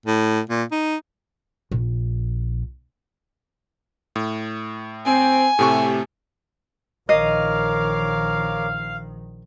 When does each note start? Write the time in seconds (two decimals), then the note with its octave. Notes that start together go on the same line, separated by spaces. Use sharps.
0.06 A2
0.49 A#2
0.71 D#4
1.71 A#1
4.16 A2
5.05 C4 G#5
5.59 A2 C3 A3 G4 C#6
7.09 A#1 D#3 A#4 C#5 D#5 F5 D6